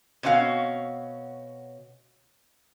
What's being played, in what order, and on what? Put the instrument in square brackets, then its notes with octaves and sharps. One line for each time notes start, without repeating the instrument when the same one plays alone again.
[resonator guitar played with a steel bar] B2 C4 C#4 F#4 F5